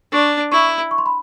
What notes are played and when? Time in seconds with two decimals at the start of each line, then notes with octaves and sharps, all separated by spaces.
0.12 D4 C#6
0.52 E4 C#6
0.91 C#6
0.98 C6
1.06 B5